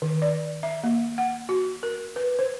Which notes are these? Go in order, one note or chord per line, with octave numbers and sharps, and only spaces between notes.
D#3
D5
E5
A#3
F#5
F#4
A#4
B4
C5